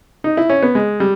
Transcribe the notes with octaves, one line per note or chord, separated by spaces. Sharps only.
D#4
E4
C#4
B3
G#3
G3